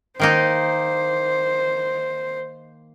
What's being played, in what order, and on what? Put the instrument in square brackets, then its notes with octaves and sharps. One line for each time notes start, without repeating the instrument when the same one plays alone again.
[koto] D#3 A#3 D#4 [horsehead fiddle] C5